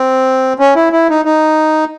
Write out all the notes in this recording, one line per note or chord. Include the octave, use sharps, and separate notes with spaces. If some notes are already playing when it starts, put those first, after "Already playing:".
Already playing: C4
C#4
E4
E4
D#4
D#4